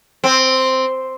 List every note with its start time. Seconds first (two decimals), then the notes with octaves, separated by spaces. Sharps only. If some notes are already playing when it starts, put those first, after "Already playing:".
0.24 C4